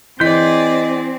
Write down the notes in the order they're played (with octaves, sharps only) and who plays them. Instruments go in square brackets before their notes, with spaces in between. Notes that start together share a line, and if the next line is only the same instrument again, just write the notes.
[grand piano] E3 B6 [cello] C4 [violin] G#4 D5 [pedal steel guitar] D#5 C6 G6